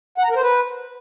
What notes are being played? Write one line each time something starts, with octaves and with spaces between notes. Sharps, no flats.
F#5
A#5
A#4
C5
B4